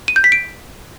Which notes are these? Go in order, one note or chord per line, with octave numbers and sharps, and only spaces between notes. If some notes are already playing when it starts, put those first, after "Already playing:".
D#7
G6
B6
D7